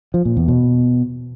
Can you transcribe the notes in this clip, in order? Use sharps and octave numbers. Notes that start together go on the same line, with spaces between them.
F3
A#2
E2
B2